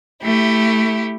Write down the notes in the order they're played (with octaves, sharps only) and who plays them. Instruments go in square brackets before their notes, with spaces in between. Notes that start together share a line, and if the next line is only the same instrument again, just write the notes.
[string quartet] A3 E4 G4